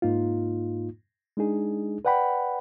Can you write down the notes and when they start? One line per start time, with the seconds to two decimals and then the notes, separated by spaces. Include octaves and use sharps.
0.02 G#2 A#3 D#4 F4
1.37 G#3 D4 D#4 G#4
2.05 B4 D5 F#5 G5 B5